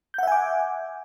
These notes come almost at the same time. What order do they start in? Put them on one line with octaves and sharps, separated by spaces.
G6 F#5 E5 G#5 D6